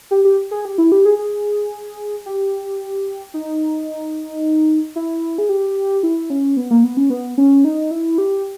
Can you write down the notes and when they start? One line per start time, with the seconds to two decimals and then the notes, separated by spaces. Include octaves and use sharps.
0.11 G4
0.25 G4
0.51 G#4
0.65 G4
0.78 E4
0.92 G4
1.05 G#4
1.19 G#4
2.26 G4
3.34 D#4
4.96 E4
5.38 G#4
5.49 G4
6.03 E4
6.30 C#4
6.57 B3
6.71 A#3
6.84 B3
6.97 C#4
7.10 B3
7.38 C#4
7.65 D#4
7.91 E4
8.18 G4